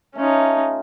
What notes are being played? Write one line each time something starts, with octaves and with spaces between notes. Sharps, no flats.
A3 C#4 D#4 F4